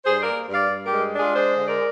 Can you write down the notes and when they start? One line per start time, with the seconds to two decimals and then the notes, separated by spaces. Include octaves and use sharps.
0.05 G2 G#4 C5
0.22 A#3 A#4 D5
0.48 G2
0.54 D5 F5
0.70 G2
0.86 G4 A#4
0.92 G#3
1.14 D4
1.19 F4 G#4
1.35 G#3 G#4 C5
1.57 D3
1.68 A#4 D5